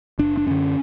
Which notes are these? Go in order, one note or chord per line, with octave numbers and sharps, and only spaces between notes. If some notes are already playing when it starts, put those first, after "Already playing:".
F#1 D4
D4
F#2 D3 C#4